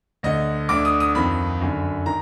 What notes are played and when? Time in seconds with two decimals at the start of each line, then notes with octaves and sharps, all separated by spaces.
0.23 D2 D3 D#5
0.69 D2 D3 D6
0.85 D#6
1.00 D#6
1.15 F2 D#3 B5
1.61 F#2 D3
2.06 D#3 A#5